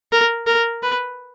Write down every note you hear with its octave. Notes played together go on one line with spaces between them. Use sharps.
A#4
A#4
B4